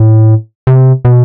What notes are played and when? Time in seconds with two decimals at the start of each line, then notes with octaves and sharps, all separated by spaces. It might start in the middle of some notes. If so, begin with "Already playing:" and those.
Already playing: A2
0.67 C3
1.05 B2